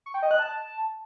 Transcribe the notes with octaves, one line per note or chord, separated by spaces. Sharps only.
C#6
G5
D#5
F#6
A5